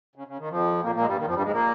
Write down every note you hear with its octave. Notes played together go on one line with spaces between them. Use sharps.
C#3
C#3
D#3
F2 F3
A#2 A#3
A#2 A#3
G#3
G2 G3
D#3
F2 F3
G2 G3
G#2 G#3
A#2 A#3